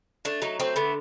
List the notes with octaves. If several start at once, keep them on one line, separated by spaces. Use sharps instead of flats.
A3 D4
F#3 D#4
A3 C4
D3 B3